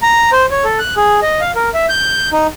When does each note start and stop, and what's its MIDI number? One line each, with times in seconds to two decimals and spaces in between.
0.02 0.30 82
0.32 0.46 72
0.51 0.64 73
0.64 0.79 69
0.79 0.94 90
0.96 1.20 68
1.22 1.40 75
1.41 1.51 77
1.56 1.69 70
1.74 1.86 76
1.89 2.30 91
2.32 2.47 63